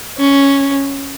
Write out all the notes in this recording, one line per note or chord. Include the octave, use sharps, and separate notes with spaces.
C#4